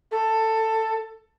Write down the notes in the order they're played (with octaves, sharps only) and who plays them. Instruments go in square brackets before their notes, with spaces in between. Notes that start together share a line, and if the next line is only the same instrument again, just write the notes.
[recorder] A4